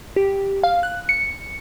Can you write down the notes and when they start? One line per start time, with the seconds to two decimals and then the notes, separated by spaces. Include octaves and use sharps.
0.16 G4
0.63 F5
0.83 F#6
1.09 C#7